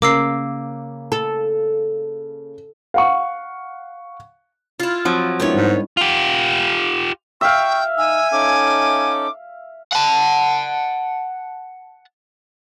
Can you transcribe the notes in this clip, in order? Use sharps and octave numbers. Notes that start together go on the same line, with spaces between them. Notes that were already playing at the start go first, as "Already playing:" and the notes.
C#3 A#3 D6 E6 C7
A4
F5 F#5 C#6
E4 F4
F3 F#3 C4
D#3 G#3 B3 D4 E4 C#5
G#2 G3
F4 G4
E5 F5 G5 C#6
D#4 G#5 E6
C#4 D#4 A4 D6
F#5 A5